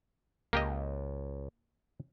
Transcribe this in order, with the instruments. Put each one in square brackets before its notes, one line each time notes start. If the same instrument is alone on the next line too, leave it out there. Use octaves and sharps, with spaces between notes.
[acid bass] C#2 [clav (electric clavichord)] A#3 G4 D#5